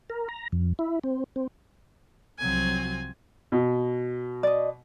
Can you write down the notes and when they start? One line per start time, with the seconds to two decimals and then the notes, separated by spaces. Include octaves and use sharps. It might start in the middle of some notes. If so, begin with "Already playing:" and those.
0.10 A#4
0.29 A#5
0.52 F2
0.79 E4
1.04 C4
1.36 C4
2.39 C2 F3 F#3 C4 G#5
3.52 B2
4.43 D5 D#5